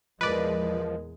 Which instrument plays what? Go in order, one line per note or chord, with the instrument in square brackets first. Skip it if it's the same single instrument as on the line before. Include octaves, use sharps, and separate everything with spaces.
[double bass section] E2 A#2 G#3 [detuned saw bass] F3 [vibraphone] A#4 D#5 [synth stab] B4 D5